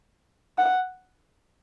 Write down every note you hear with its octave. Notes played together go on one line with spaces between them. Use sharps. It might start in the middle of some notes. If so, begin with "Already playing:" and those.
F#5